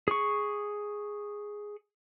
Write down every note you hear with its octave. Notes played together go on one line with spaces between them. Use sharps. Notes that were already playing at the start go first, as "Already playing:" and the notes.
G#4 C#6